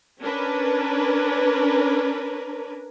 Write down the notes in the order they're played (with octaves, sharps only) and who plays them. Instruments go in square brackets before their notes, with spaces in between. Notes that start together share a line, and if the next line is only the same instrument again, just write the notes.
[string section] C#4 D4 A#4 B4